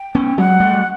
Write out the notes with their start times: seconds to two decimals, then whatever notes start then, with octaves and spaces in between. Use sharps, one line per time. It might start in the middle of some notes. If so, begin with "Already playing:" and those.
Already playing: G5
0.15 B3 C#4
0.38 F#3 G#3 F#5
0.60 G3 A3